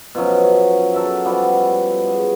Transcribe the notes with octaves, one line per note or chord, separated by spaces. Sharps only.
B2 F3 F#3 C#4
C#4
F#4 A4 A#4 E5
F3 G3 B3 F#4
G#4